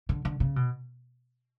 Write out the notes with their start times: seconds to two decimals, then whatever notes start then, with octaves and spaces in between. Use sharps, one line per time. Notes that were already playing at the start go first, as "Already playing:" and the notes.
0.09 D3
0.25 D3
0.40 C#3
0.56 B2